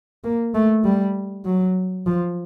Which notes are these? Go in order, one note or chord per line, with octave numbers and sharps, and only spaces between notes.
A#3
A3
G3
F#3
F3